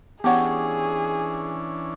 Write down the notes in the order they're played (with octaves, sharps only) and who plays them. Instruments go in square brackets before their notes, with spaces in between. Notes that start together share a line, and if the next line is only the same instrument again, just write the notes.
[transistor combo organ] E3 C#4 D4 [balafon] B3 F#5 [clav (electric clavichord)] G4 C#5 [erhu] G#4